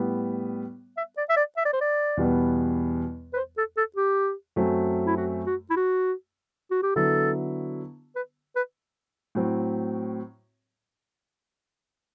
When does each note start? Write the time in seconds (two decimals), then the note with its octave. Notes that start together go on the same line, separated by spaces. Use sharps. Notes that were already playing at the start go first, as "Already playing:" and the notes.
Already playing: A2 G3 B3
0.97 E5
1.17 D5
1.30 E5
1.37 D5
1.57 E5
1.65 D5
1.73 C5
1.81 D5
2.17 E2 B2 G3 B3
3.33 B4
3.36 C5
3.57 A4
3.77 A4
3.96 G4
4.56 F#2 F#3 A3 C4
5.06 E4
5.17 F#4
5.46 F#4
5.70 E4
5.76 F#4
6.71 F#4
6.82 G4
6.96 D3 F#3 B3 E4 A4
8.15 B4
8.56 B4
9.35 A2 F#3 C4